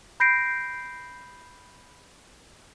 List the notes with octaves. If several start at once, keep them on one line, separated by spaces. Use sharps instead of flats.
B5 G6 A#6 C7 D7